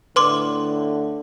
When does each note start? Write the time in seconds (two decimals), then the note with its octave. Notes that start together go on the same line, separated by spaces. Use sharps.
0.16 A2 D3 B4 C6 D6